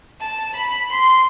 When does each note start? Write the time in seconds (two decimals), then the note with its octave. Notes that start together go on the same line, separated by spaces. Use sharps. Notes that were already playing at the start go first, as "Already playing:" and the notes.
0.21 A5
0.55 B5
0.91 C6